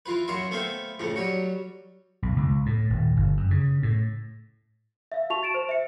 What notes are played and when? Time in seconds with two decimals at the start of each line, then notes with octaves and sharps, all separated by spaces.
0.06 E3 F4 B4
0.28 F#2 F#4 E5 F5 C6
0.51 A3 B3 C4 E5 F5
0.99 F2 A2 C#3
1.16 F#3 G3 F#4
2.22 B1
2.36 C#2
2.66 A2
2.90 D#1
3.17 G1
3.37 F#2
3.51 C#3
3.83 A2
5.12 E5 F5
5.30 F#4 A5 C#6 F7
5.43 A6 D7 E7
5.54 C5
5.69 E5 C#7